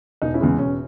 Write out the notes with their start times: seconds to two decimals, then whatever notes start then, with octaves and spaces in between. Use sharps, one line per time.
0.22 E1 D#4
0.34 C#4 E4
0.41 E2 C#3 G#3
0.58 E1 C#4